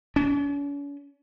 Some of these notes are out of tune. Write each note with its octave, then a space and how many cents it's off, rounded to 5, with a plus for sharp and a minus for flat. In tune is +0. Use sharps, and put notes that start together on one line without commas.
C#4 +45